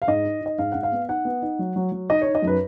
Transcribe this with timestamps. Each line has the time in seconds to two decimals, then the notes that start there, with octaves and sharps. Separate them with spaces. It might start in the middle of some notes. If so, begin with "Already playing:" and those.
0.02 F5
0.08 G#2 D#5
0.25 D#4
0.41 D#4 D#5
0.58 G#2 F5
0.72 G#2 F#5
0.83 F5
0.92 B3
1.08 D#4 F#5
1.25 B3
1.42 D#4
1.59 F#3
1.76 F#3
1.92 F#3
2.10 D#4 D#5
2.22 C#5
2.27 D#4
2.35 D#5
2.42 F#2
2.47 B4